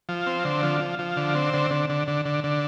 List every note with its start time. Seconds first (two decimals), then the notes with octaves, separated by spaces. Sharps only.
0.09 F3
0.26 C4
0.45 D3
0.63 F3
0.80 F3
0.99 F3
1.17 D3
1.35 C4
1.54 D3
1.71 D3
1.89 D3
2.08 D3
2.25 D3
2.44 D3